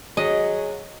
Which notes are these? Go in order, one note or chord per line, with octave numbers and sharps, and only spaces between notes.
F#3 G#4 D#5